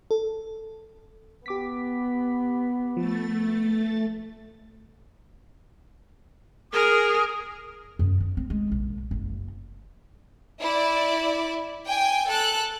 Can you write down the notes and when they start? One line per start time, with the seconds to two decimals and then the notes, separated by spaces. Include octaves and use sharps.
0.11 A4
1.46 B3 G4 D6 B6
2.97 F3 A3 A6
6.73 G#4 A#4 D#6
7.99 F#2
8.20 F#3
8.37 C4
8.50 G#3
8.71 A#1
9.11 F#1
10.60 E4 D5
11.86 G5 G#5
12.27 A4 F#6